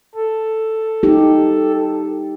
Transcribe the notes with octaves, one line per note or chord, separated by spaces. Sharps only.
A4
D#4 G4